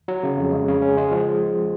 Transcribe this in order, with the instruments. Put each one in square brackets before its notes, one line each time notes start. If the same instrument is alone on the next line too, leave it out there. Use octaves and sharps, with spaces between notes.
[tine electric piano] F#3
C#3
F2
G#3
C#3
C#4
G#3
F3